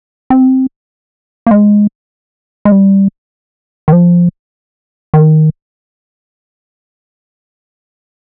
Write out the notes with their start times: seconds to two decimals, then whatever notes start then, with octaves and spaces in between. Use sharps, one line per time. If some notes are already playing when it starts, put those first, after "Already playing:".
0.30 C4
1.47 A#3
1.51 G#3
2.65 G#3
2.72 G3
3.88 D#3
3.93 F3
5.14 D#3